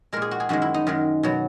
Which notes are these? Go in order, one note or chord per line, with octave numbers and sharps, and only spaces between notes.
A#2 G#3 A#4
G#4
F#4
G#4
F#2 D#3 G#3 F#4
E4
D#4
F#2 D#3 G#3
B2 F#3